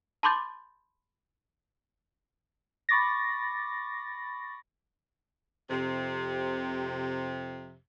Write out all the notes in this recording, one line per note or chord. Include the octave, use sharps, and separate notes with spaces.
A5 B5 C6 D6 G6 A6
B5 C#6 D6 A6 A#6
F2 C3